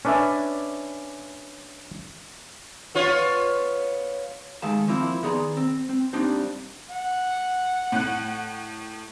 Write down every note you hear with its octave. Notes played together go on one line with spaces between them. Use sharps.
C#4 D4 B4 D5 E5 G#5
B3 F4 C#5
D#3 G#3 A3 F5 A5
F3 A#3 C4 E4 F4
D#3 B3 G#4 D5 A#5 C6
C4
C4
G3 A#3 C4 D4 D#4 C5
F#5
A2 F#6